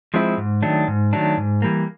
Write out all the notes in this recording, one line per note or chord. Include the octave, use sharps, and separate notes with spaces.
F3 G#3 C4 E4
G#2
D#3 F#3 A3 D4
G#2
D#3 F#3 A3 D4
G#2
E3 G3 A#3